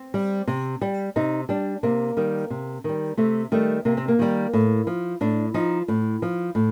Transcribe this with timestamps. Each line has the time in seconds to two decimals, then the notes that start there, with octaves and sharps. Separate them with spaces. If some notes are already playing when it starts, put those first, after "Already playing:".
Already playing: C4
0.14 G3
0.48 C3
0.81 G3
1.16 C3 D#4
1.49 G3 D4
1.83 C3 A#3
2.17 D#3 G3
2.50 C3
2.84 D#3 G3
3.17 C3 A3
3.52 D#3 G3 A3
3.85 C3 A#3
3.97 C4
4.08 A#3
4.19 D#3 G3
4.53 A2
4.87 F3
5.21 A2 D4
5.54 F3 D#4
5.88 A2
6.22 F3
6.55 A2